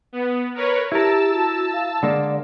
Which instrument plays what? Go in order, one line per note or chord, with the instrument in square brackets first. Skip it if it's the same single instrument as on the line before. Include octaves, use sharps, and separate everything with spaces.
[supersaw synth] B3
A#4 B4 C#5
[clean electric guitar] E4 A#4 [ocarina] G4 [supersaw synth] A5 E6
[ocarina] F#4
F5
[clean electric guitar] D3 G#3 A#3 [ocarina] D5